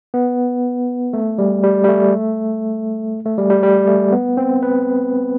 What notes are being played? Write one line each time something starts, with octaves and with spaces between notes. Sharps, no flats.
B3
A3
G3
G3
G3
A3
A3
G3
G3
G3
A3
B3
C4
B4